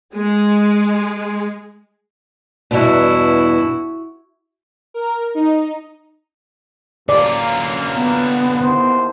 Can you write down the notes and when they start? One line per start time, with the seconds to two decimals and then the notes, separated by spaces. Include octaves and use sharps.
0.15 G#3
2.71 E2 G2 B2 E4 F#4
4.94 A#4
5.35 D#4
7.09 F#2 D3 A#3 F4 D5
7.93 B3
8.63 D#2 A2 C5